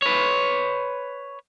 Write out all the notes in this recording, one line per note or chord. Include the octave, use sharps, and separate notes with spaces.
B4 C#5